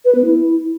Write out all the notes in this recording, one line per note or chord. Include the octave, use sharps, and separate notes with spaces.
B4
B3
E4